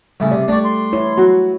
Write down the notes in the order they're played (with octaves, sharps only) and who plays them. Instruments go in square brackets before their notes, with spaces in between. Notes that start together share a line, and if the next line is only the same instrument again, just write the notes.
[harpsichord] A2 C#3 E4 [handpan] G3
[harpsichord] C3 [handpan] D5
[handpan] A3 [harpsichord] D4 G4 C#6 [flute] D5
[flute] C6
[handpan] E4 C#5
[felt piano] F#3 [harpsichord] F#4